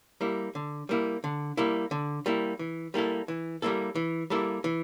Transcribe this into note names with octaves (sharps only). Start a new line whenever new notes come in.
G3 A#3 E4
D3
G3 A#3 E4
D3
G3 A#3 E4
D3
G3 A#3 E4
E3
G3 A#3 E4 A4
E3
G3 A#3 E4 A4
E3
G3 A#3 E4 A4
E3